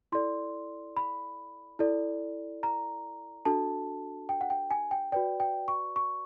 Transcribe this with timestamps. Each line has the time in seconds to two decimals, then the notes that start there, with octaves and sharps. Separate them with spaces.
0.12 E4 A4 D5 C6
0.97 B5
1.79 E4 A4 D5
2.63 A#5
3.45 D4 F#4 A4 A5
4.29 G5
4.41 F#5
4.50 G5
4.71 G#5
4.91 G5
5.12 F#4 B4 D5 G5
5.40 G5
5.68 C#6
5.96 C#6